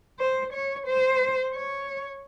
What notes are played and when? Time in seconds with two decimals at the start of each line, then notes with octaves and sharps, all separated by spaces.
0.20 C5
0.53 C#5
0.87 C5
1.54 C#5